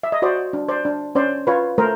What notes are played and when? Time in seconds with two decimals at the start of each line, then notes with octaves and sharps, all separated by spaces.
0.03 E5
0.12 D#5
0.22 F#4 C5 D5
0.53 D4
0.69 C5 D5
0.85 D4
1.15 C#4 C5 D5
1.47 F4 B4 C#5
1.78 A3 A#4 C5